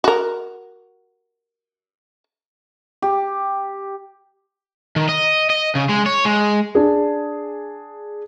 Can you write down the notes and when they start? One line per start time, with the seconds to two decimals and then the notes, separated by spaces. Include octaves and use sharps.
0.04 F#4 A#4
3.02 G4
4.96 D#3
5.09 D#5
5.50 D#5
5.75 C#3
5.89 G#3
6.06 C#5
6.25 G#3
6.75 D4 G#4